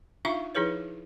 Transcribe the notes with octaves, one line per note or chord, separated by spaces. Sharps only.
D4 D#4 F4 E5 F5 C#6
F3 D#4 E4 G#4 B4 C#5